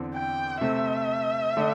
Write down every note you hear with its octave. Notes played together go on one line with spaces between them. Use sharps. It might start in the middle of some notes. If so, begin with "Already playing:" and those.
Already playing: E2 D3 C4
G5
C3 A3 C4 E5
D3 A3 D4